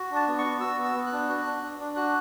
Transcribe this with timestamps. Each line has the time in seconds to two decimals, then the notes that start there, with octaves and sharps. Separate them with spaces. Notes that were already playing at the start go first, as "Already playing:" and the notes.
Already playing: F#4
0.11 D4
0.16 A5
0.27 B3
0.38 C#6
0.44 F#4
0.61 F#4 E6
0.78 B3
0.84 E6
0.95 B3
1.06 F#6
1.12 D4
1.29 F#4
1.45 D4
1.62 D4
1.79 D4
1.96 F#4 F#6